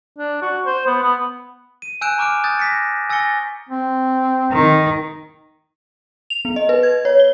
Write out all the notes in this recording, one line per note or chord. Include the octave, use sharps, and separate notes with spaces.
D4
F#4
C5
B3
B3
D#7
G#5 E6 F#6 G6 D7 E7
A#5 C#6 D6 F6 F#6 D7
D#6 F#6 G6 A6
A#6 B6 C#7
G#5 E6 A6 A#6 C#7 G7
C4
D#3
F7
B3
D#5
B4
G#6
C#5
G7